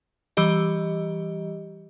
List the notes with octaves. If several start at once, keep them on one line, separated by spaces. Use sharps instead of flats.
E3 G3 G4 D#5